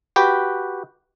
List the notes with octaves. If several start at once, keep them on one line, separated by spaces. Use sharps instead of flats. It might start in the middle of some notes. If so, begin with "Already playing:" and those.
F#4 G4 B4 G5